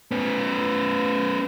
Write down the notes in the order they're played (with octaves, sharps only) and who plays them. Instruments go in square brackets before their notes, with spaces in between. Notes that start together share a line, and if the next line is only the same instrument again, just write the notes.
[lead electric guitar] B3 C#4